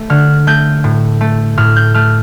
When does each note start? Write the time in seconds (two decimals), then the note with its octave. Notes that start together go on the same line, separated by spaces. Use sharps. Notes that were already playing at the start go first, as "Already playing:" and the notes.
Already playing: A3
0.10 D3 F6
0.47 A3 G6
0.84 A2
1.21 A3
1.57 A2 F6
1.76 G6
1.94 A3 F6